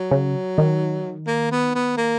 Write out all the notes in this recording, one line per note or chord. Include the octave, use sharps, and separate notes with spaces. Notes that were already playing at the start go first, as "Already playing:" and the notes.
Already playing: F#3
C#3
D#3
A#3
B3
B3
A#3